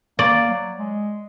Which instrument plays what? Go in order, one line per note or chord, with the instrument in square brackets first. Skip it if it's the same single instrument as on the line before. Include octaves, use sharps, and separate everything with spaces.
[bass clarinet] A#3 [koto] D5
[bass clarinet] F#3
G#3